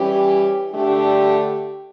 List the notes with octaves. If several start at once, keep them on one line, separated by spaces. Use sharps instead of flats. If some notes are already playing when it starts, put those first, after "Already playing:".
Already playing: E3 G3 C#4 G4
D3 A3 D4 G4